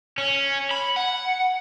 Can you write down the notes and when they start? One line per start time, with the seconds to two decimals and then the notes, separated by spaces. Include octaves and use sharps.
0.18 C#4
0.71 B5
0.97 F#5